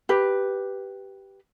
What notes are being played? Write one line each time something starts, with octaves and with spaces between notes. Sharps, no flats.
G4 B4